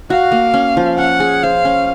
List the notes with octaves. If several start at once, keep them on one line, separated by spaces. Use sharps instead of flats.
F#4 F5
A#3
C#4
F3
C#4 F#5
G#4
C5 F5
C#4